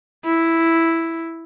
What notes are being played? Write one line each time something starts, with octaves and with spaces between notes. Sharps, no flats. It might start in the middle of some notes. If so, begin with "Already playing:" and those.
E4